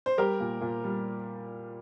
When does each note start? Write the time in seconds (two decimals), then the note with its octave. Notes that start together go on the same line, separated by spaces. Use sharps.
0.06 C5
0.18 G3 G4 A#4
0.40 A#2
0.61 A#2
0.84 G3